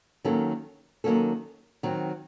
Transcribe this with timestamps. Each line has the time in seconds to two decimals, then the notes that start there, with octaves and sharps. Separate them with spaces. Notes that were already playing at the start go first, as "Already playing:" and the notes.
0.25 D#3 F#3 A#3 C#4 A4
1.04 D#3 F#3 A#3 C#4 A4
1.83 D#3 F#3 C4